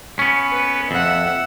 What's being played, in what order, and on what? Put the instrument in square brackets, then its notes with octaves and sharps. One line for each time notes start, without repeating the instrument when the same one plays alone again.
[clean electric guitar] B3 C#4
[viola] B4
[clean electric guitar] F2 [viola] E5 F#5